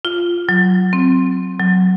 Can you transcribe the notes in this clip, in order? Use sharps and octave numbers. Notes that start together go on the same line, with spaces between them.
F4
F#3
C4
F#3